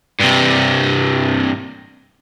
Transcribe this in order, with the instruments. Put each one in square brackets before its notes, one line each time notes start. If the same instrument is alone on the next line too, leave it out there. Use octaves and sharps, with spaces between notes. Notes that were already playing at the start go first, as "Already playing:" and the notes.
[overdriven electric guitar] G2 C3